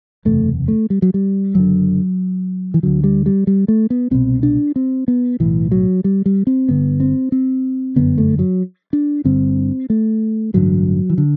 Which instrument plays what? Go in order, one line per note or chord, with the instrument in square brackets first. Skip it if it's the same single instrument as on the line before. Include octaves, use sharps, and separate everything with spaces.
[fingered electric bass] F#1 E2 C3 A3
A3
G3
F#3
G3
F#1 F#2 D3 F#3
E3
D2 D3 F#3
G3
G3
G3
A3
B3
C2 B2 C4
D4
C4
B3
B1 A2 E3
F#3
G3
G3
C4
G1 G2 D3 B3
C4
C4
G1 F#2 D3 B3
A3
F#3
D4
G1 G2 D3 C4
A3
A1 G2 D3 F#3
E3
D3